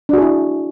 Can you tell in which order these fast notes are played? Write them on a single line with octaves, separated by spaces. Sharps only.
D4 F#4 G#4 E4